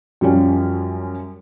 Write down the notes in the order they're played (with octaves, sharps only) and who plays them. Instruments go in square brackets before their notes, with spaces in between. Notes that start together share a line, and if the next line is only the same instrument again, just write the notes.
[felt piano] F#2 F3 G3 C#4